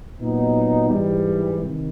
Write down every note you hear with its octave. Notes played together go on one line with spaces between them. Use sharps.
A#2 F#3 B3 D#4
G#2 E3 G3
C3 D#3